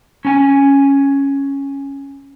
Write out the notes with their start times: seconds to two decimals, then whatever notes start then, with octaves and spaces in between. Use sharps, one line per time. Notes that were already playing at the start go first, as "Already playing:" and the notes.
0.25 C#4 G#5